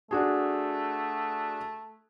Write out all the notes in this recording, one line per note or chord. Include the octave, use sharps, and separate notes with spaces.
A3 D4 F#4 G#4